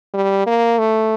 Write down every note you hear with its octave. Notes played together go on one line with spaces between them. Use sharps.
G3
A#3
A3